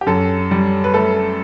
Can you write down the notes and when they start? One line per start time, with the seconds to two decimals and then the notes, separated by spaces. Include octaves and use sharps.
0.01 G4
0.06 F#2 A4
0.51 G3
0.84 B4
0.94 A3 A4